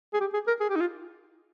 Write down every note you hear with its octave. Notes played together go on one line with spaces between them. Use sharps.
G#4
G4
G#4
A#4
G#4
G4
D#4
F4